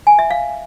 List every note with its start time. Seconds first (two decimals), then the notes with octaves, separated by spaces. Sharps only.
0.07 G#5
0.19 E5
0.31 F5